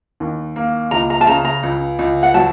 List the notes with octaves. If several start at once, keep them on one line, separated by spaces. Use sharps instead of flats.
D#2
A#3
C#2 A#5
A#5
A5
C#3 A#5
A#5
C#2
C#2
F#5
F#3 A5